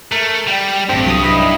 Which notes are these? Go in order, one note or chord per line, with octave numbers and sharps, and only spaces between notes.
A3 A#4
G3 G5
A1 G2 A3 C4
C2 F#3 D#6
D#4 E4 B4